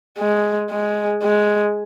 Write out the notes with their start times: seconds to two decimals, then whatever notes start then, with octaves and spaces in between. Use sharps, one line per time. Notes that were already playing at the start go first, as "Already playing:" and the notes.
0.19 G#3
0.71 G#3
1.23 G#3